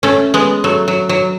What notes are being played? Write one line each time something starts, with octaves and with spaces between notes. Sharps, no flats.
A3 C#4
G#3 B3
F#3 A3
F#3
F#3